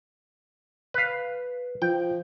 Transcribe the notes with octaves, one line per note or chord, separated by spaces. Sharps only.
B4 F5
F3 G5